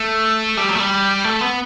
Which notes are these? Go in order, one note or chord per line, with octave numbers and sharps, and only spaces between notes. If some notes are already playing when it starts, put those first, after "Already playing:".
Already playing: A3
G3
F#3
A3
G3
A3
B3